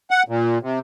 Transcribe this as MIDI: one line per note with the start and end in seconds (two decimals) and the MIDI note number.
0.11 0.23 78
0.28 0.58 46
0.62 0.79 48